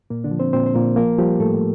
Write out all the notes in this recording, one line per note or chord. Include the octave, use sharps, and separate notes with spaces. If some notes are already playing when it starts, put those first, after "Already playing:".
A#2 A#3
D3 D4
F3
C4 C5
A#2 C4 C5
C5
A#2 A#3 A#4
F3 A#3 A#4
F3 G3 G4
A2 A3 A4